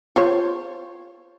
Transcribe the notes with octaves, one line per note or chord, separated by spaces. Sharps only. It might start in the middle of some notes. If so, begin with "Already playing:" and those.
F4 C5 C#5